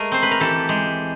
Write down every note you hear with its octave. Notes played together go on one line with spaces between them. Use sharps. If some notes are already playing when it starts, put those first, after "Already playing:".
Already playing: G#3 A3 G#4 A#4
C4 C5
B4
A#4
E3 G4 A4
G#3